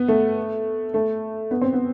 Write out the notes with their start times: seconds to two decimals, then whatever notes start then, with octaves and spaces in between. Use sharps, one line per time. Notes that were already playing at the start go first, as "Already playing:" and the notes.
Already playing: B3
0.08 A3
0.94 A3
1.51 B3
1.61 C4
1.73 B3